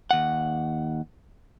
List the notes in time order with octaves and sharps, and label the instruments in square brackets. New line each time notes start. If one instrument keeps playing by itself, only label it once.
[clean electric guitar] D#2 F#5